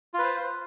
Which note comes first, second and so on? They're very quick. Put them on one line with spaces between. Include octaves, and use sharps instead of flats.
F4 B4 C5